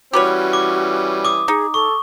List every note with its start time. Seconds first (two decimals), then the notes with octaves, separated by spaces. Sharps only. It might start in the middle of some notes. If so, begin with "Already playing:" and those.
0.13 E3 G3 C#4 F#4 G4 B4 C#5
0.53 D6
1.25 D6 D#6
1.48 D#4 G#4
1.74 A4 C#6